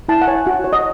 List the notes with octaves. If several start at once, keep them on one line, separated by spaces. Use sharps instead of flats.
E4 A5
F#5
C#5 G#5
F#4 F#5
C#5
D#5